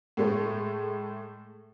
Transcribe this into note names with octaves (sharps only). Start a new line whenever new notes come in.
A2 G#3 A3